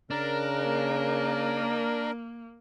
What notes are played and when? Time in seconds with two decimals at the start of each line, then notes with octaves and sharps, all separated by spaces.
0.11 C#3 D4 A#4
0.63 A#3